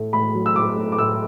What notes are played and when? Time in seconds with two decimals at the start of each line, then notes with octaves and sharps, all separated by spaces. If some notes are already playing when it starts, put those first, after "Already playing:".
Already playing: A2 A3
0.13 A2 B5
0.35 F#3
0.46 E6
0.56 A2 D6
0.76 A3
0.92 D6
0.98 A2 E6